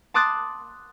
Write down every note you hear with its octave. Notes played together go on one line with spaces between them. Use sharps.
A5 C6 D6 D#6 F#6 A6